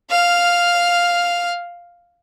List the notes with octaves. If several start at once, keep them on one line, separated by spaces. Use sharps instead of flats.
F5 F6